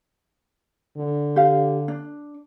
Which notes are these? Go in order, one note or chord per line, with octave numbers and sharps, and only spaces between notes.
D3
G4 F5
D4